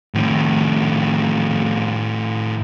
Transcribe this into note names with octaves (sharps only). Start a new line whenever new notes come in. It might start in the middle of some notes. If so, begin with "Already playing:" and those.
A2 D#3